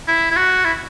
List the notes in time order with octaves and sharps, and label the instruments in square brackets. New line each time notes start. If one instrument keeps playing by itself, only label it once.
[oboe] E4
E4
F#4
E4